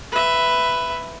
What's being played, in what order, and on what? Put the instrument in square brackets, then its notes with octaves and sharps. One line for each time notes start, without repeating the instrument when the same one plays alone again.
[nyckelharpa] B4 E5